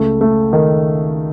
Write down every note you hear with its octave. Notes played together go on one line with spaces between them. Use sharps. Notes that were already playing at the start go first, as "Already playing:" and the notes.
Already playing: C#2 A3
A3
D#3